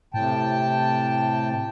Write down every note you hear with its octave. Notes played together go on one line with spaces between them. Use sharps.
A2 C3 G5 A5